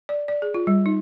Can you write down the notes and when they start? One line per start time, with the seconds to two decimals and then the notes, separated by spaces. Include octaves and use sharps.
0.09 D5
0.28 D5
0.42 G#4
0.54 F4
0.67 G3
0.86 D#4